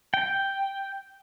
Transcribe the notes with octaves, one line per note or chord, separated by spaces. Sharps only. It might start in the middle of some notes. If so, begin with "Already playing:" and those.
G5